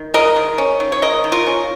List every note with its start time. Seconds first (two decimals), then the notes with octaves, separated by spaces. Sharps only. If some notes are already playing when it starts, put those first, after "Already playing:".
Already playing: D#3
0.14 G#3 A#4 D#5
0.36 D#3
0.58 C#4
0.80 D#3
0.92 C#5
1.02 G#3 A#4 D#5
1.24 D#3
1.32 F4 A#4
1.47 C#4